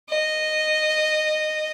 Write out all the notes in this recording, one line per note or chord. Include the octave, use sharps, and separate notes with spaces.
D#5